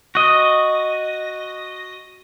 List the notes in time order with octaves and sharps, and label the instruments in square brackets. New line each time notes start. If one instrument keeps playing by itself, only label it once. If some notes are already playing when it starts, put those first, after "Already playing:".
[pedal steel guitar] F#4 D#5